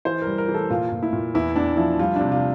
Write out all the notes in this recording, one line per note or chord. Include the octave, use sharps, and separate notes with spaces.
E3 C5
G3 A#4
A#4
E3
A4
A#2 F4
A#2
E4
A#2
E2 E4
E2 D4
F3 E4
G3 F4
C3 D4
F4